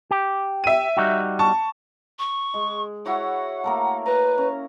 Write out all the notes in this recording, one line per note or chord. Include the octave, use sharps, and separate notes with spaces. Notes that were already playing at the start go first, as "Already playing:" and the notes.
G4
E5 D#7
G3 D#4 F#4
A5 C#6
C#6
G#3
E4 F#4 C#5 F#5
A3 A#3 A#4
B4 A#5
C#4